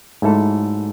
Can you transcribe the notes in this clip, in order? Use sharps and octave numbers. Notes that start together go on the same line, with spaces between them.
G#2 F#3 A3 E4 A4